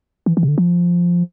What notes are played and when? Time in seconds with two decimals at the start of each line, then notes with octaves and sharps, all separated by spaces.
0.26 E3
0.37 E3
0.43 C3
0.48 D3
0.58 F3